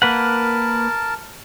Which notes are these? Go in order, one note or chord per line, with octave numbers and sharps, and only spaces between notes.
A#3 A#4 B4 F#5 A5